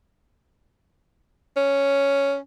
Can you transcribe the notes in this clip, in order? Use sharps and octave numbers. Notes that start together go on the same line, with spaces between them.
C#4